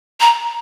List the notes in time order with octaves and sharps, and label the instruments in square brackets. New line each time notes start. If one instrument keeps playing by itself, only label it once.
[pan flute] A#5